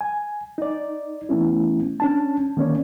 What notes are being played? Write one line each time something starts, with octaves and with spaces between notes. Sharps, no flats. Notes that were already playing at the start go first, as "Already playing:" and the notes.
G#5
D#4 D5
E3 A3 B3 C#4 E4
C#4 D4 A5
D#3 A#3 C#4 C#5 D5